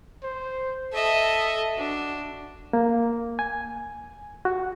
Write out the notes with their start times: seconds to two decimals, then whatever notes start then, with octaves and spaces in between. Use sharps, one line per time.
0.23 C5
0.93 A4 D#5 E5
1.77 D4 F#4
2.73 A#3
3.39 G#5
4.45 F#4